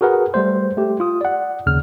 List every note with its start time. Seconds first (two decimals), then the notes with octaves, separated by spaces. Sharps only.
0.01 F#4 G#4 A#4 B4 F#5
0.34 G3 A3 C5
0.77 A3 G4
1.00 F4 D#6
1.21 D5 F#5
1.66 D#2 C#3 F6